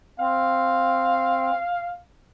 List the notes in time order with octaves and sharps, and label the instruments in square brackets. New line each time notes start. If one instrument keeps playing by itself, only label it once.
[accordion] C4 [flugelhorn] F5